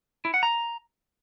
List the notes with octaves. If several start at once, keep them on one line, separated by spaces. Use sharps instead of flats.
E4
F#5
A#5